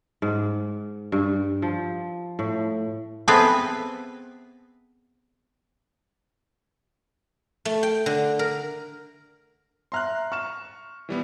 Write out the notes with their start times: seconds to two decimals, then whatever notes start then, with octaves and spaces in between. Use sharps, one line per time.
0.22 G#2
1.12 G2
1.62 F3
2.39 A2
3.28 B3 C4 G#4 A4 B4 E5
7.65 A3
7.83 G5
8.06 D3
8.39 A#4
9.92 E5 A#5 C6 F6 F#6
10.32 C#6 F6 E7
11.09 E3 G3 B3